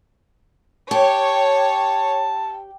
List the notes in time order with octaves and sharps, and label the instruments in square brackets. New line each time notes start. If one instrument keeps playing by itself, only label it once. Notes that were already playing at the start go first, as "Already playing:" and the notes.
[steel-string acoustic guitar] G4 [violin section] C#5 [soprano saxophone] A5